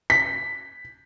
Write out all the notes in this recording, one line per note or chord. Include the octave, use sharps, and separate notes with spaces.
B6